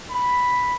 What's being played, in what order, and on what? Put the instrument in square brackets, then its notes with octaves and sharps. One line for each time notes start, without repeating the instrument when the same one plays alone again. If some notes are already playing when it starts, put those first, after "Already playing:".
[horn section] B5